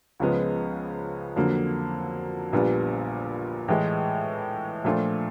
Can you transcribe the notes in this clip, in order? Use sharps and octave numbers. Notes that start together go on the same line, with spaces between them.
C#2 C#3 F3 G#3 B3
F2 D3 F#3 A#3
A#1 A#2 G3 B3 D4
A2 E3 G#3
A#2 F3 A3 D4 F4